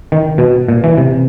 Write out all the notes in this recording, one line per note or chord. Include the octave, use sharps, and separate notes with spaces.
D#3
B2
A#2
E3
C3